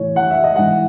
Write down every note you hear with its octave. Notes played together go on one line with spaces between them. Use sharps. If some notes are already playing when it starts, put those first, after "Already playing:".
Already playing: A2 E3 C#5
F#5
E5
D#5
G#2 E3 F#5